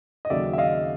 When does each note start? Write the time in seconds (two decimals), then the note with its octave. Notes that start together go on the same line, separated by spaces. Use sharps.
0.25 D#5
0.30 D#2 C#3 F#3 D5 E5
0.53 E5
0.58 D#5 F5